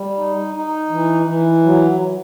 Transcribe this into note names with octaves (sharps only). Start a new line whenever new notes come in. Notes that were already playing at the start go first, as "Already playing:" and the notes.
Already playing: G3
D#4
D#4
E3
E3
F#3